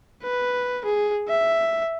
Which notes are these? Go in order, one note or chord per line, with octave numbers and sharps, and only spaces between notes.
B4
G#4
E5